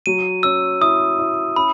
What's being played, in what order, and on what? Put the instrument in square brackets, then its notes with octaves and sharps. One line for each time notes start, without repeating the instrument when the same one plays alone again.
[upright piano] F#3 [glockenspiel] D#7
[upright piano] C#4 [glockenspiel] E6
[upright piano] E4 [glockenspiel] D#6
[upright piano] E4
[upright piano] C#4 [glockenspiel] B5